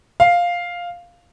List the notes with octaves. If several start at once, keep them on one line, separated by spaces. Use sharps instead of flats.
F5